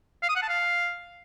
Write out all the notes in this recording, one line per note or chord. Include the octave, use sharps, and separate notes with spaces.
F5
D#6
F#5
A5
F5